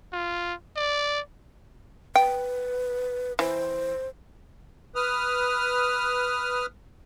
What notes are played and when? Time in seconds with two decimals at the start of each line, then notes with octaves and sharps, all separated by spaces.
0.13 F4
0.76 D5
2.16 B4 G5
3.39 E3 C5
4.95 B4 D#6 F6